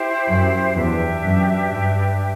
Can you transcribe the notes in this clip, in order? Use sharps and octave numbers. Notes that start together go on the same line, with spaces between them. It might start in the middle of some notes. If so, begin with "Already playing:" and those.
Already playing: E4 G4 C5
F#2
E2 D4 G4 B4 E5
F#2
G2